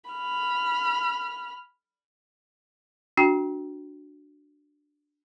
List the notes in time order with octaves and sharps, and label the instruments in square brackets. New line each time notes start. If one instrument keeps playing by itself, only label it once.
[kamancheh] B5 F6
[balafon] D4 F#4 G5